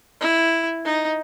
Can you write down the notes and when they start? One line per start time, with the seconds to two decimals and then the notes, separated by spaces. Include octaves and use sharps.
0.21 E4
0.85 D#4